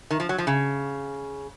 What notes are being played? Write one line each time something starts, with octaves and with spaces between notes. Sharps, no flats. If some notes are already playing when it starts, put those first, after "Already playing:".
D#3
F3
F#3
F3
C#3